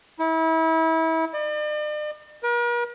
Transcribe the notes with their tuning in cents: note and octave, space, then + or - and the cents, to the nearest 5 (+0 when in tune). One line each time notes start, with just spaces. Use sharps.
E4 -30
D5 +45
A#4 +45